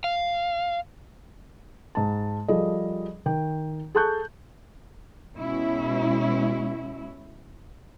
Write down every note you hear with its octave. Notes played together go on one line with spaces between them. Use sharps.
F5
G#2 A5
F3 G3 G#4 A4 D#5
D#3 G5
G#4 A4 A5 C#6 F#6 G6
B2 G#3 C#4 E4